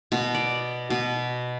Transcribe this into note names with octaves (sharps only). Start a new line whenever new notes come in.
B2
D5
B2